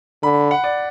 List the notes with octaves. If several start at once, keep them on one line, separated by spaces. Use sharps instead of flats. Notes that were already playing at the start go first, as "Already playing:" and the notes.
D3 B5
F#5
D5